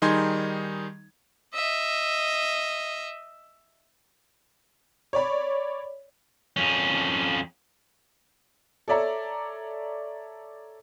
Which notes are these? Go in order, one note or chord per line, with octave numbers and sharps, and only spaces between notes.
D#3 G3 D#4 G#4 C6 G#6
D#5 E5
C#5 D5 B5
F2 C#4
A4 C#5 D5 E5 A#5